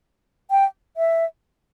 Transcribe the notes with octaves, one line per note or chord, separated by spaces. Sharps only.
G5
E5